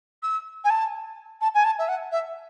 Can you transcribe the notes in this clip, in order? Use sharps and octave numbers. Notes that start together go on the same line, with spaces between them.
E6
G#5
A5
A5
G#5
A5
E5
F#5
E5